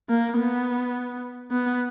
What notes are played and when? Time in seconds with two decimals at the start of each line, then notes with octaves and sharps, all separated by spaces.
0.09 A#3
0.38 B3
1.51 B3